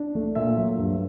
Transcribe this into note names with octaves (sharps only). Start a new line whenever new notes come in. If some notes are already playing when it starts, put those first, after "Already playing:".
Already playing: D4
A3
A#2 E5
F#3
G2